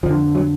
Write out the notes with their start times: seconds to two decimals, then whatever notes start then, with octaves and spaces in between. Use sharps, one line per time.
0.03 F2 D3 F3
0.35 F#3